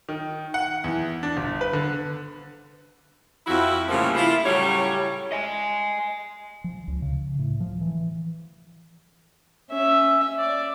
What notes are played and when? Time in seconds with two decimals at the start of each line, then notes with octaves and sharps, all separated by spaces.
0.09 D#3
0.54 F#5
0.84 E2
1.23 D4
1.37 G1
1.61 B4
1.73 D3
3.47 F2 E4 F#4
3.88 A2 C#3 F3 G3 A3 A#3
4.15 E4 F4
4.45 A2 C#3 F#3 G3 C#5
5.32 D#5 G#5
6.64 F3
6.88 C#2
7.02 C#3
7.39 A2
7.60 F3
7.81 E3
9.72 C#4 E5
10.38 D5 D6